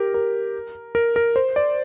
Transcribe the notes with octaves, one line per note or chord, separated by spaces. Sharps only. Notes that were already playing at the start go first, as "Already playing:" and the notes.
Already playing: G4 A#4
A#4
A#4
A#4
C5
D5